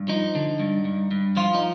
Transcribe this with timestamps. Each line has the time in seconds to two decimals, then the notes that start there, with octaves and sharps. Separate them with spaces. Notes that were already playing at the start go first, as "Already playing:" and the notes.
Already playing: G2
0.08 F3 D#4
0.35 D3
0.60 G2
0.85 G2
1.11 G2
1.37 F3 F4
1.55 D#4